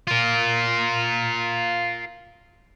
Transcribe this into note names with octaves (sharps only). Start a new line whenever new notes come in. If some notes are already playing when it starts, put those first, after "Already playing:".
F4 A#4